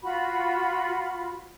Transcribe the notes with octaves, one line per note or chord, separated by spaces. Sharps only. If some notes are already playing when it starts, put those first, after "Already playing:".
F4 F#4 B5